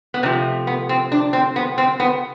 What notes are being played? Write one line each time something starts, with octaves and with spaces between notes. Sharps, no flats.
B3
C3 F3 A3 C4
B3
C4
D4
C4
B3
C4
B3